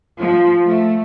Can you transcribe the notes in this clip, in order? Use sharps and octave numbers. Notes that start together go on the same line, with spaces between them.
F3
A3